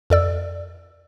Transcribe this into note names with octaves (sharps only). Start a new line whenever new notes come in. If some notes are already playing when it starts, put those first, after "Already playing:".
F2 A4 D5 E6